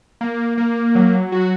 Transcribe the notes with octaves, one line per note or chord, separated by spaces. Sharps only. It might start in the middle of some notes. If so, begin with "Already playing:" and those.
A#3
A#3
F#3
F#4